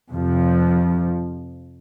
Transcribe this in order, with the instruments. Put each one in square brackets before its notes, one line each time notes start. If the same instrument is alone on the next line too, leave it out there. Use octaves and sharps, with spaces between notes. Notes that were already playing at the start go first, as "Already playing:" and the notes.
[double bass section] F2 C3 F3